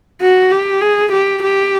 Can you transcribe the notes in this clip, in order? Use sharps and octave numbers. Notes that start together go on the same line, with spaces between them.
F#4
G4
G#4
G4
G4